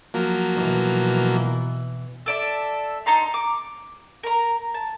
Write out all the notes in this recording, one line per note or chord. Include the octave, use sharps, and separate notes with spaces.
F3 F#3 A#3
B2 E3
A4 D5 E5
D#4 A5 A#5 C6
D6
A#4 A#5
A5